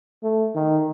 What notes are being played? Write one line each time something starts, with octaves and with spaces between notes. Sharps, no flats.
A3
D#3